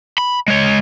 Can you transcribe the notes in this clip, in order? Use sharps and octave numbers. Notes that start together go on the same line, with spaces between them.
B5
G#3 C#5